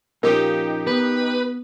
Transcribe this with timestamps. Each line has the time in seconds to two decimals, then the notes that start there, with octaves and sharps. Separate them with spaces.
0.23 A#2 F3 C#4 D#4 G4 A#4
0.87 B3 B4